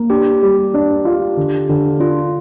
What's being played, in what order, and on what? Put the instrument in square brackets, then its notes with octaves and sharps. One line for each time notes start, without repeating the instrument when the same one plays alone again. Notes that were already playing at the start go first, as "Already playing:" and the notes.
Already playing: [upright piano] A#3
[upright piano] D4 [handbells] G4
[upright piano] G3
D4
F4
D3
D3
[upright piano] D4 [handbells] F4